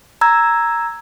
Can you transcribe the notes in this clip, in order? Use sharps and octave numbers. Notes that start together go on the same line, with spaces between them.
A#5 E6 G#6